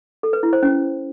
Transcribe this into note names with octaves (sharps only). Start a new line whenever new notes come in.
A4
B4
E4
C5
C#4